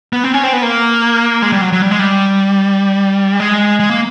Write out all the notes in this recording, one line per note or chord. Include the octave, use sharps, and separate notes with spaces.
B3
C4
C#4
C4
B3
A#3
G#3
G3
F#3
F#3
G3
G#3
G3
G#3
G#3
A#3